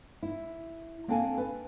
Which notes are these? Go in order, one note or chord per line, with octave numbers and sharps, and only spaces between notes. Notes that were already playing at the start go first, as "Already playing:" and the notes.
E4
A#3 C4 D4 A4 F5 G#5
B4